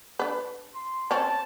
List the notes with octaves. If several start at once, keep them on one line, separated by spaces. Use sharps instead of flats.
D4 B4
C6
C4 C#4 A5